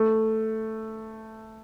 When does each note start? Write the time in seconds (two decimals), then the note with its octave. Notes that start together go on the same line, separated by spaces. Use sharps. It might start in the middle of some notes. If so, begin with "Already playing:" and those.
Already playing: A3